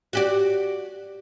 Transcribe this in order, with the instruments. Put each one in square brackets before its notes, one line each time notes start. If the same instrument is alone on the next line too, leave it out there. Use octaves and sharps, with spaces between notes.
[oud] F#4 G4 D5